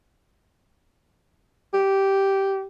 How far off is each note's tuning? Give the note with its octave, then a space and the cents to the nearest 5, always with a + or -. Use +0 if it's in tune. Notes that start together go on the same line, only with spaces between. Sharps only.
G4 -10